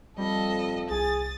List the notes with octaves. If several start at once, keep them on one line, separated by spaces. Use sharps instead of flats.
F2 G3 A4 D#5
C2 G#4 D#6 A6